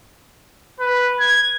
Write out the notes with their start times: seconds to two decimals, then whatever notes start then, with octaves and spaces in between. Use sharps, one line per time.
0.80 B4
1.20 G#6